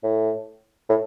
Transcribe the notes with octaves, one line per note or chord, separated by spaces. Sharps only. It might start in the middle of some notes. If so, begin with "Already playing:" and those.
A2
A2